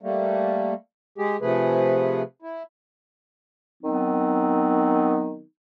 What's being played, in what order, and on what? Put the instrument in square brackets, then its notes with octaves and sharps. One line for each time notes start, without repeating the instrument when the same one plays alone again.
[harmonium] G3 A3 A#3
G#3 G4 G#4
C3 F3 A3 G#4 B4
E4
[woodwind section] D#3 F#3 B3 C4 D#4